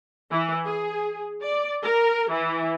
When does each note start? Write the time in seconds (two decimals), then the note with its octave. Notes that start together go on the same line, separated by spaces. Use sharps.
0.31 E3
0.65 G#4
1.42 D5
1.83 A#4
2.30 E3